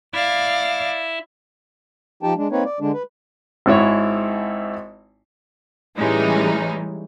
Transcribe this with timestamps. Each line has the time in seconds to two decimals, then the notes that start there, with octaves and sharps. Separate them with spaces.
0.14 E4 D5 F5
2.23 F3 D#4 G4 G5 A5
2.37 G#3 D4
2.52 A#3 C4 D#4 B4 C#5
2.65 D5
2.80 D3 G#3 D4
2.93 B4
3.66 G#1 G#2 E4 C#5
5.97 A2 E3 G3 G#3 C#4 D#4